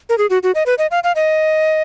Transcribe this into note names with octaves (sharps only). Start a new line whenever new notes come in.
A#4
G#4
F#4
F#4
D#5
B4
D#5
F5
F5
D#5